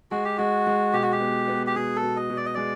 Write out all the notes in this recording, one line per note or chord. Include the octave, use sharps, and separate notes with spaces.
G#3 F#4
G4
G#3 F#4
G#3
B2 G4
F#4
G4
B3
B3
G4
B2 G#4
A4
B2
D#5
B2
D5
D#5
G#3 D5